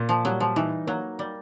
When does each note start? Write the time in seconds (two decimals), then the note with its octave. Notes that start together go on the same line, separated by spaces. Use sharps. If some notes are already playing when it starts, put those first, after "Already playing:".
Already playing: A#2
0.09 F3
0.25 F#3 G3
0.40 F3
0.56 E3 D#4
0.87 F#3 A#3
1.19 G3